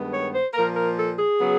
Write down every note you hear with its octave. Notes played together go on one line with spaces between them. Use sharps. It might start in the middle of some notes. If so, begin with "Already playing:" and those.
Already playing: G2 D#3 G#3 B3
C#5
C5
A#2 F3 A#3 A#4
A#4
A4
G#4
C#3 F#3 B3